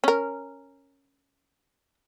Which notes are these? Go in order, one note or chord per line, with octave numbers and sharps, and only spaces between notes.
C#4 A#4